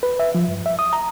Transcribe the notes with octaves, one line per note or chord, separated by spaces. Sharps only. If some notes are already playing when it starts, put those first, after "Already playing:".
B4
E5
F3
G2
E5
D#6
A#5